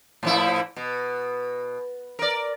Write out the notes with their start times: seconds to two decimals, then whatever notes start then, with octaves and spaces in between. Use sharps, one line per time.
0.23 A2 F3 E4
0.76 B2
2.19 A#4 D5